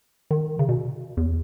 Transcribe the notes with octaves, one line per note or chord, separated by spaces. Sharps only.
D#3
C#3
B2
E2